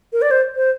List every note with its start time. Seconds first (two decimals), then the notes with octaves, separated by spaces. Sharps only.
0.13 A#4
0.22 D5
0.31 C5
0.55 C5